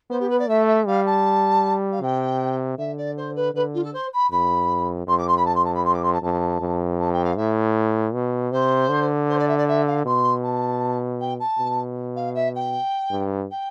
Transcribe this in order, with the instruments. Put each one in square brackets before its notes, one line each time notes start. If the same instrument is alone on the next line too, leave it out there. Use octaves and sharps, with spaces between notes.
[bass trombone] B3 [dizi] C5
[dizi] G4
B4
D5
[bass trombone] A3 [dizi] E5
[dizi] E5
[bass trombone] G3 [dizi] F5
[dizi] A5
F5
[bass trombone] C3 [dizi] G5
[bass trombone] D3 [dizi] E5
[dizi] D5
C5
B4
[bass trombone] D3 [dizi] B4
[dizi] F4
A4
C5
B5
[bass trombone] F2 [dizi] B5
[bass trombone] F2 [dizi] C6
[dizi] D6
C6
B5
A5
C6
A5
B5
C6
D6
C6
A5
[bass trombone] F2 [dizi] A5
[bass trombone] F2
[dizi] A5
G5
F5
[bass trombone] A2 [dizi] E5
[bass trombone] B2
[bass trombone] C3 [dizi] C5
[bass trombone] D3
[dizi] C5
D5
E5
D5
E5
F5
[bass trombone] B2 [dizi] C6
[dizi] A5
G5
A5
[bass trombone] B2
[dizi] F5
E5
G5
[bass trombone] G2
[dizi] G5